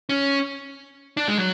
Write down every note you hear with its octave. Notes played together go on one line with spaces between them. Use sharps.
C#4
D4
G#3
F#3